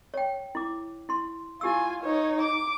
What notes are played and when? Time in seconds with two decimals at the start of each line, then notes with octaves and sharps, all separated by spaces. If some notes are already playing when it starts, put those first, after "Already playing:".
0.14 C#5 G5
0.55 E4 D6
1.09 E4 C6
1.61 E4 F4 G4 G#5 E6
2.03 D#4 B4 C#5
2.40 A#5 D6